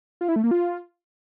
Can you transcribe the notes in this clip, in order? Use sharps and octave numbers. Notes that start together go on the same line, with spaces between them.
F4
E4
A3
A#3
F4